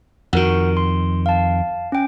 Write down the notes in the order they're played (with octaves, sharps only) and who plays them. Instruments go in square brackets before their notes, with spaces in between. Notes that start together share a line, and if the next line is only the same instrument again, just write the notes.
[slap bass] F2 D#3 [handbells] F#4 A#4 F#5
[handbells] C6
F5 A5
C#4 G5